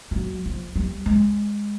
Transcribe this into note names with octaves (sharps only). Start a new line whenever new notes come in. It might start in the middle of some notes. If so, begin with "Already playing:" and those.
F3
F#3
F3
G3
G#3